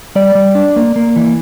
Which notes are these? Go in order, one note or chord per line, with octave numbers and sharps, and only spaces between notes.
G3 D5
G3
D4
A#3
A#3
E3